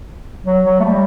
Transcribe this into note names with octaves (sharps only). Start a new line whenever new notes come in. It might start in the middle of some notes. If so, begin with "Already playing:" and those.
F#3
F#3
A3
G3